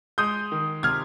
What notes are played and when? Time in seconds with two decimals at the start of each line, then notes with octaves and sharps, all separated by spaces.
0.18 G#3 D#6 G6
0.52 D#3
0.83 C3 F6 G#6